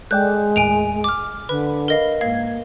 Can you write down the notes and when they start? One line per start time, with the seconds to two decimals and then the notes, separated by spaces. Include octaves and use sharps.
0.11 G#3 A4 D5 G5 F#6 G6
0.56 D#2 A2 G#5 D7 F7
1.04 D6 F6
1.49 D3 B4 B5
1.88 A#4 D#5 F5
2.21 G#2 A#3 F5 G#6